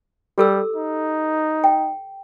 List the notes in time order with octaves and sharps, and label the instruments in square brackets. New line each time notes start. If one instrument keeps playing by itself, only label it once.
[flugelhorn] G3 [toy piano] G4 A4 E6
[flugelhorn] D#4
[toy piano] G5